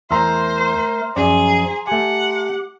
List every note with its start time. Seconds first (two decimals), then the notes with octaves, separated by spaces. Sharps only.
0.11 E2 A3 A#4 C5 A#5 C6 E6
1.16 F#2 F3 C#4 G#4 D5
1.87 A3 G4 F#5 G#5